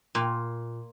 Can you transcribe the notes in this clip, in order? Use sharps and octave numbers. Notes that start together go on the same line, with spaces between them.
A#2